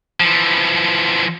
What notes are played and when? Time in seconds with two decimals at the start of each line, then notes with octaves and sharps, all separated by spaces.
0.20 E3 F3